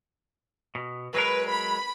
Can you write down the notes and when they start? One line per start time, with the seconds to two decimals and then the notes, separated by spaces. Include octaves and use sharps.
0.75 B2
1.14 F#3 G#3 A#4 B4
1.50 B5